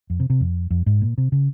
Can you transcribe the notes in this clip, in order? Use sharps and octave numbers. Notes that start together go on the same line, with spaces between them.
F2
C3
C3
F2
F2
G#2
A#2
C3
C#3